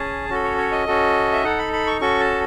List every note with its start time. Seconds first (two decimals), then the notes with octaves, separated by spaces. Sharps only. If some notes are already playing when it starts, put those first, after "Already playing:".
Already playing: C#4 G#4 A5
0.29 C#4 F#4 A4
0.44 C#5
0.58 C#5
0.71 D#5
0.87 C#4 F#4 A4
1.32 E5
1.43 D#4 A4 F#5
1.58 B5
1.73 B5
1.87 C#6
2.01 C#4 F#4 A4 C#6
2.20 A5